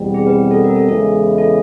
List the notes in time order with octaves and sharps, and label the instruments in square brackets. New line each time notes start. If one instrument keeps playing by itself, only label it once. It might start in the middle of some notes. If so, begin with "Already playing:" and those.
Already playing: [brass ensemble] E2 B2 G3 C4
[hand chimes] G#4
B4
A4
A#4
A4
[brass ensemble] E2 C#3 E3 G#3 [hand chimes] A4
[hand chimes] A4